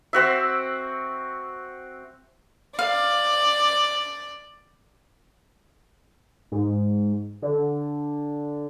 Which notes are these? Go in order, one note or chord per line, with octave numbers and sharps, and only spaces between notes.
C4 F#4 E5
D5 F5
G#2
D3